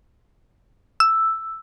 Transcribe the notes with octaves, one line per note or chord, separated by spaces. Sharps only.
E6